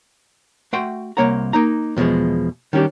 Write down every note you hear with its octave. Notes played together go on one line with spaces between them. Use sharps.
A3 F#4 F#5 G5 C6
C2 D#3 A#3 C#5 F#5 A#5
A#3 D#4 A#5
E2 B2 E3 F3 G#3
D#3 G3 C#4 D4 G4